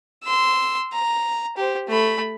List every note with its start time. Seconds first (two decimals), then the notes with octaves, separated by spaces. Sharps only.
0.24 C6 E6
0.92 A#5
1.57 G4 C5
1.88 A3 B5